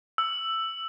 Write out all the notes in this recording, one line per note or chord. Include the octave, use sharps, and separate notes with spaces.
E6